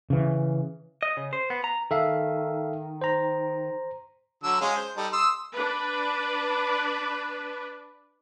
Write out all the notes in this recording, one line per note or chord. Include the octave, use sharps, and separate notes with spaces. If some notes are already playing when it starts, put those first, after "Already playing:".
C#3 E3
D#5
C#3
C5
B3
A#5
D#3 A4 E5 F5
C5 A#5
D3 F#3 E6
G#3 C#4 F5
C5
G3 D#4 A4
C6 D#6 E6
D4 B4